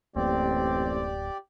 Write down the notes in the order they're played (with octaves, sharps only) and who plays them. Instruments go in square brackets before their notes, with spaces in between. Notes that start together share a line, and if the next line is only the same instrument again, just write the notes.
[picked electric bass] D1 F#2 A#3 [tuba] A1 [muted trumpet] C4 [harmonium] G4 D5